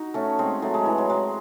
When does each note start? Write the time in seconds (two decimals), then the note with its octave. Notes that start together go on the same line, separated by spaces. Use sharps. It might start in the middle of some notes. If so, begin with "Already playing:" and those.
Already playing: D#4 F#4
0.14 A3 C#4
0.39 G#3 C4
0.62 F#3 A3
0.74 G#3
0.85 E3
0.98 F#3
1.10 G#3